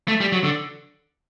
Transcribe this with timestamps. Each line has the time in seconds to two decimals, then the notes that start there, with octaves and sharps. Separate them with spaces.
0.08 A3
0.20 G3
0.32 F#3
0.44 D3